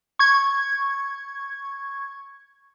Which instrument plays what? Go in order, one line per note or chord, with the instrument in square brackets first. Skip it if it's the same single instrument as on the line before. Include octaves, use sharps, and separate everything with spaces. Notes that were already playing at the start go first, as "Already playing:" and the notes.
[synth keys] C#6 G#6